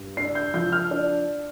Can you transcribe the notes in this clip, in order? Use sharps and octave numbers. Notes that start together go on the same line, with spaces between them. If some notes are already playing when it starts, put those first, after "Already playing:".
Already playing: G2
D4 C7
G6
F3 G6
F6
D4